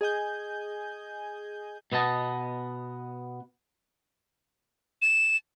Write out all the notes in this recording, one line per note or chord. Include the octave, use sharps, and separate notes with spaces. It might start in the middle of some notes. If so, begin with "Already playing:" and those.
G#4 D#5 G#5 G6
B2 B3 D#5 A5
E7